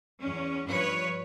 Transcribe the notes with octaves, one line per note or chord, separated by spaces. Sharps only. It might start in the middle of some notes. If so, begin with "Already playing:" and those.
E2 C#4
G2 F3 B4 C#5